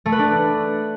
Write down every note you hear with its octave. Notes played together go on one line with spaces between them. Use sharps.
A3
B4
D4